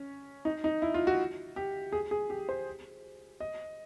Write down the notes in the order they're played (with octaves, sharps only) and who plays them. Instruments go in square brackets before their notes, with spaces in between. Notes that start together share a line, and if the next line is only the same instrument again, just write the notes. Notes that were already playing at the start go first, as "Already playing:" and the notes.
Already playing: [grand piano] C#4
D#4
D#4
E4
F4
F#4
G4
G#4
G#4
G4
C5
D#5